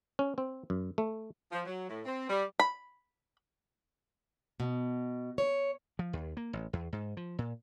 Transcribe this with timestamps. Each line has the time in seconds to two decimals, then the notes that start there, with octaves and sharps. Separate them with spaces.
0.19 C#4
0.38 C4
0.70 F#2
0.98 A3
1.52 F3
1.66 F#3
1.89 A2
2.05 C4
2.29 G3
2.60 B5
4.60 B2
5.38 C#5
5.99 F3
6.13 D#2
6.37 A#3
6.53 A1
6.73 E2
6.93 G#2
7.17 F3
7.39 A#2